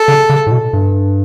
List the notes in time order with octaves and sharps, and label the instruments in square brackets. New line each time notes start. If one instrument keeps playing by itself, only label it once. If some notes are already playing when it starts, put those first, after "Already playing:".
Already playing: [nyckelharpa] A4
[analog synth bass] C#3
C#3
A2
B2
G2